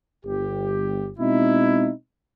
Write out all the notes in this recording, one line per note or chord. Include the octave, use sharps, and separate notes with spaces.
G1 G4
B2 G#3 C4 D#4 E4